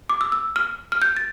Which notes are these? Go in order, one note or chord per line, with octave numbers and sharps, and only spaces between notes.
D6
E6
E6
F6
F6
G6
A6